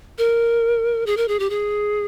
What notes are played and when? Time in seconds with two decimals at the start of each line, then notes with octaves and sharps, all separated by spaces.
0.18 A#4
1.06 G#4
1.17 A#4
1.28 G#4
1.39 G4
1.50 G#4